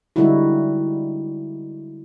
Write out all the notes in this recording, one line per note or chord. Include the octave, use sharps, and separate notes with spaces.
D3 G3 G#3 D#4 E4 F#4